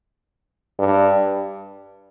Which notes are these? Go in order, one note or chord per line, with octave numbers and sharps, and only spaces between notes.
G2